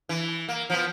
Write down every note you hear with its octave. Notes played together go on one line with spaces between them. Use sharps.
E3
A#3
F3 B3